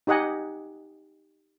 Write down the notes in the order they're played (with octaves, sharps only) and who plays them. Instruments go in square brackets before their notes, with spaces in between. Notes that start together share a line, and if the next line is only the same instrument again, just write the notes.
[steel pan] D#4 G4 D#5 F#5 G#5